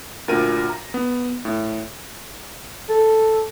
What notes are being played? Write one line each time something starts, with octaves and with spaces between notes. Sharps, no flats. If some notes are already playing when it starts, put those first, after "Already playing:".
D2 A#2 A#4 D#7
A#5
B3
A2
A4